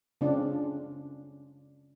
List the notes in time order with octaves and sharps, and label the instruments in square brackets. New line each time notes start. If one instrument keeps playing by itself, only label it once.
[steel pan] C#3 C4 D4 F4